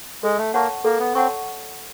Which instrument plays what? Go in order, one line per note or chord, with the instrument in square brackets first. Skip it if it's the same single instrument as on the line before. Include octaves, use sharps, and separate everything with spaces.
[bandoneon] G#3 [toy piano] A4
[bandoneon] A3
[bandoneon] A#3 [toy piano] C#5 F#5 A5 C#6
[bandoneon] A#3 [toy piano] A4
[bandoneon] B3
[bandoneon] C4 [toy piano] C#5 F#5 A5 C#6